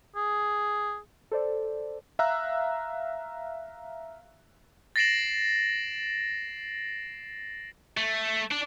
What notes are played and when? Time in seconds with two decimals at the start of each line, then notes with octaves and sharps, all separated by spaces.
0.16 G#4
1.31 A4 C5 D5
2.19 E5 F5 A#5 E6 F#6
4.96 A6 A#6 C7 D7 E7 F#7
7.97 A3
8.51 D4